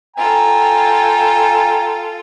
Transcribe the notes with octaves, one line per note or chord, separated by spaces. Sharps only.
F4 A4 G5 G#5 A#5